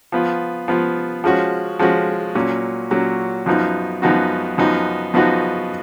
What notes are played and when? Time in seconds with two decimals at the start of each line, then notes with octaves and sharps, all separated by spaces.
0.12 F3 B3 F4
0.68 F3 B3 F4
1.24 F3 G#3 C#4 F#4
1.79 F3 G#3 C#4 F#4
2.35 A#2 F#3 C#4
2.91 A#2 F#3 C#4
3.46 F#2 F3 B3 D#4 F#4
4.02 F#2 F3 B3 D#4 F#4
4.58 F#2 F3 B3 D#4 F#4
5.14 F#2 F3 B3 D#4 F#4